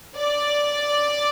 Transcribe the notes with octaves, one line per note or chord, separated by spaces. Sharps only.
D5